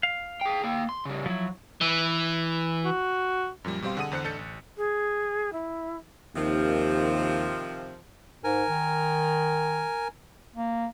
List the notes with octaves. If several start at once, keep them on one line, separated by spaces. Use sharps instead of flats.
F5
G#4 G5
A#3 G5
C6
C#3 G3
F3 F#3 E4
E3
F#4
F#2 A#2 F3 G3
B2 G3 C4 G4 F5 C6
D3 G#4 F#5 D#6 D#7
E2 D3 C5 F#6 C#7
A1 D4 A4 G6 A6 C#7
A1
G#4
E4
D#2 C3 D#3 F3
G#2 A#4 G#5
D#3
A#3